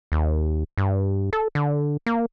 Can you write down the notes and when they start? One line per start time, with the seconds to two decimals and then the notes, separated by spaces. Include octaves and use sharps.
0.12 D#2
0.78 G2
1.33 A4
1.55 D3
2.06 A#3